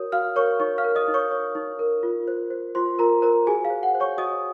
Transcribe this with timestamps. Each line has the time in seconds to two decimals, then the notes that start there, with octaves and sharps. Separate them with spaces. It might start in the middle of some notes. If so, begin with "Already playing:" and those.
Already playing: F#4 A#4 C#5 D#6
0.12 F#4 F5 F6
0.36 A#4 C#5 C#6
0.60 D#4 C#5 C#6
0.78 F5 F6
0.84 A#4
0.95 D#5 D#6
1.08 D#4
1.14 C#5 C#6
1.31 C#5
1.55 D#4
1.79 A#4
2.03 F4
2.28 C5
2.50 C5
2.75 F4 C5 C6
2.99 F4 A#4 A#5
3.22 A#4 C5 A#5
3.47 F#4 G#4 G#5
3.65 F5
3.70 C5
3.83 F#5
3.95 C5
4.00 C#5 C#6
4.18 F#4 D#5 D#6